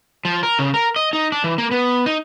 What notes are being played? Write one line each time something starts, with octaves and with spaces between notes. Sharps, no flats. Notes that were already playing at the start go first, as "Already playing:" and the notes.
F3
A#4
C#3
A#4
D#5
D#4
D4
E3
A#3
B3
D#4